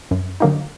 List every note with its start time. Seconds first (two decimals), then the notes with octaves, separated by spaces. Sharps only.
0.11 F#2
0.40 D3 F#3 A#3 D#4